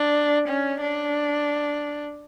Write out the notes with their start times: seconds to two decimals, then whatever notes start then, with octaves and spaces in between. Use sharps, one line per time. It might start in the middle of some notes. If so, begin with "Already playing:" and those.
Already playing: D4
0.48 C#4
0.81 D4